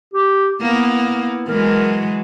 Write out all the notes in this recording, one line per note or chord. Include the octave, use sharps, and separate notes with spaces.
G4
A#3 B3 E4
E3 F#3 G#3 A#4